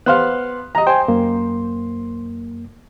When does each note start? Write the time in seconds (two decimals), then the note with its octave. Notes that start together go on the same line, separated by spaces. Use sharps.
0.06 B3 C5 F5 F#6
0.75 D#5 A#5
0.87 C5 G5 G#5
1.08 F#2 A#3